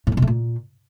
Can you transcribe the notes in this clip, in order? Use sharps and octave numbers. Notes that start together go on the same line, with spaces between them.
A2
G2
B2
A3
A#2